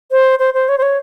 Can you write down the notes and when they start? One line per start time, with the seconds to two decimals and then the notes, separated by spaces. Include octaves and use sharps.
0.11 C5
0.39 C5
0.54 C5
0.69 C#5
0.78 C5
0.82 C#5